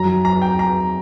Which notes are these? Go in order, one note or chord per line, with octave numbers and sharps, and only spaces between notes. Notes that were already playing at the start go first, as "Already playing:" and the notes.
Already playing: F#2 F#3 A#5
A#5
G5
A#5